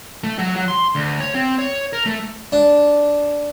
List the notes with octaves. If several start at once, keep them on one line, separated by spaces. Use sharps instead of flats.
A3
F#3
F#3
C6
D2
C#5
C4
C#5
A#4
A3
D4